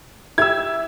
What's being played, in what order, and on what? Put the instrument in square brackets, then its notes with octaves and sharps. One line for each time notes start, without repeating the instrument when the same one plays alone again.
[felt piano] E4 G4 E5 [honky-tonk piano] E6 G#6